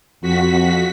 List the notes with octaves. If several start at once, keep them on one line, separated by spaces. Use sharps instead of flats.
F2 F#4 B6